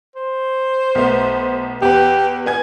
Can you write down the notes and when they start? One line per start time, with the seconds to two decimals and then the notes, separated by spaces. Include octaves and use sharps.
0.16 C5
0.95 B1 A3 B3
1.82 E2 G4 B4
2.46 B3 G#5 G#6